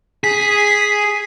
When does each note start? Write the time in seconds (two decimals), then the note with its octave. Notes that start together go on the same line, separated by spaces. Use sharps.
0.24 G#4 B6